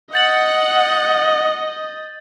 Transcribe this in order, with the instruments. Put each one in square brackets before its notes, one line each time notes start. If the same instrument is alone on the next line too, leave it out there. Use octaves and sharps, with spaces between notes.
[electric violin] D#5 [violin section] F#5 [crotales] G6 A6 F#7